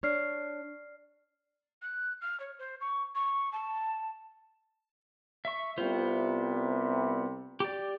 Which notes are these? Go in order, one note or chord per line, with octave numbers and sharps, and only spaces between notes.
D4 C#5 D5 F6 C7
F#6
F6
C#5
C5
C#6
C#6
A5
E5 C#6
C2 C3 G3 B3 F4 C5
G4 D5